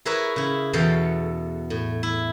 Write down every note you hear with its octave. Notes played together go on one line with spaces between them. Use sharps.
E4 G#4 A#4 B4 C#5 E5
C#3 E4
E2 B2 A4 F5 G5
A2
E4